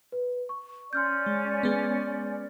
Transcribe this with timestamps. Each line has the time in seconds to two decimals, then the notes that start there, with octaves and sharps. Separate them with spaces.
0.12 B4
0.49 C#6
0.93 C#4 D5 C6 F6 G6
1.26 G#3
1.63 G#3 B3